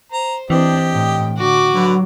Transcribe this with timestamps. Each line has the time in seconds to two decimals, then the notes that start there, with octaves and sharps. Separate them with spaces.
0.12 C5 A#5
0.50 E3 C4 D4 G4 D#5
0.93 A2 G5
1.37 D3 F#4 D6
1.73 D3 F#3 B4